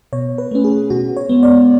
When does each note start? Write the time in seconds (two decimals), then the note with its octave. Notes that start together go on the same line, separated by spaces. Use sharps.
0.13 B2 C#5
0.38 B4
0.51 A3 C#4
0.64 G#4
0.90 B2 F#4
1.17 C#5
1.29 G#3 B3
1.43 D5